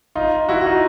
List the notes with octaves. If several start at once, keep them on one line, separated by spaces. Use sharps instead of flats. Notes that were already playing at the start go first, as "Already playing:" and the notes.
D#4 F4
E4 F#4
F#4
D#4 F4